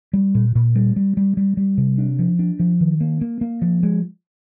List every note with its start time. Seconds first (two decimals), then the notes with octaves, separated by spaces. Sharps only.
0.13 G3
0.35 A#2
0.55 A#2
0.76 G3
0.96 G3
1.17 G3
1.37 G3
1.57 G3
1.78 C3
1.98 D4
2.19 F3
2.39 D4
2.60 F3
2.81 D#3
3.01 A#3
3.21 A#3
3.41 A#3
3.62 F3
3.83 G#3